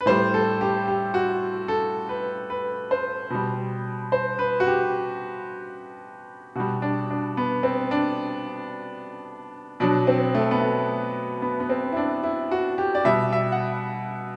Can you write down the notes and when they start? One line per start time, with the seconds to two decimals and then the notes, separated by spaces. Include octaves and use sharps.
0.01 B4
0.06 A2 G3 C5
0.34 A4
0.61 G4
0.88 G4
1.14 F#4
1.68 A4
2.09 B4
2.50 B4
2.91 C5
3.30 B2 G3
4.12 C5
4.39 B4
4.60 F#4
4.67 G4
6.55 B2 G3 F#4
6.82 D4
7.10 D4
7.37 B3
7.63 C4
7.91 D4
9.80 B2 F#3 D4
10.07 C4
10.35 A3
10.51 B3
10.61 A3
11.42 B3
11.60 B3
11.69 C4
11.92 E4
11.97 D4
12.23 E4
12.51 F#4
12.78 G4
12.95 D5
13.05 B2 G3 E5
13.33 E5
13.52 F#5